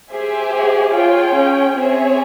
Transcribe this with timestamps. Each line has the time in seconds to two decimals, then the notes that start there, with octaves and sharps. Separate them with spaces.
0.11 G4 G#4 C5 E5 G#5
0.53 G#4
0.94 F4 G#4 C#5 G5
1.36 C#4
1.76 C4 G#4 C#5 E5